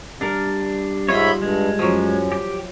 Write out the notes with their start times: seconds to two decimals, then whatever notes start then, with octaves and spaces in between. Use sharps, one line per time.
0.21 G3 D4 A#4 F#5
1.09 G#2 F4 C#5 D#5 E5 B5
1.42 G2 G#3
1.79 F#2 F3 F#3
2.32 G4